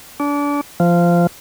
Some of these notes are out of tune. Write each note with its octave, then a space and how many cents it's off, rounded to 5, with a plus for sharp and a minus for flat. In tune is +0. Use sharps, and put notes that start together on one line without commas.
D4 -30
F3 -15